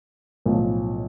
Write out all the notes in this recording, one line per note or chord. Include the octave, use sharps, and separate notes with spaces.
B1 A2 F3